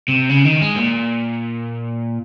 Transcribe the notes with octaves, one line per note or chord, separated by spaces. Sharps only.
C3
C#3
D#3
G#3
A#2